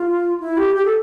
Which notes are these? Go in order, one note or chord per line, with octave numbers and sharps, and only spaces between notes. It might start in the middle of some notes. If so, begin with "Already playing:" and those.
Already playing: F4
E4
G4
G4
A4